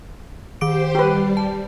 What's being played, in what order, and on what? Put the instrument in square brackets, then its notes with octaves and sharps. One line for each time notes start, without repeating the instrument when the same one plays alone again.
[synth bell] D#3 D6 D7 [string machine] G4 C5 C6
[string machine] G3 [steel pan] G4 B4
[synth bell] A5